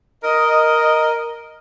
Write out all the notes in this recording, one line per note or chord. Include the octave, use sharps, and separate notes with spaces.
A#4 D#5